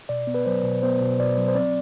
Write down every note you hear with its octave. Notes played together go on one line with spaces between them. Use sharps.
B2 D5
B3
B4
F#3 C5
B2
B3 C5
B2
B2 D5
F#3
C5
C4 D5